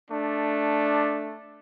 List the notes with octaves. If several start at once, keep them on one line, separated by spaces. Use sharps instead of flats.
A3 D4